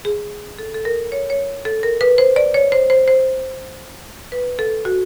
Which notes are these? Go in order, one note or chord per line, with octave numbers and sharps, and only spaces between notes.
G#4
A4
A4
A#4
C#5
C#5
A4
A#4
B4
C5
D5
C#5
C5
C5
C5
B4
A4
F#4